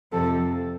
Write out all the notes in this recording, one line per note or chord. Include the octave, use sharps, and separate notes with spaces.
F2 C3 F3 A4